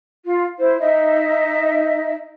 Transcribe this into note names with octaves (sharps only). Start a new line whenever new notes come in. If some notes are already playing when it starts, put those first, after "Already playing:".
F4
E4 C5
D#4 D#5 E5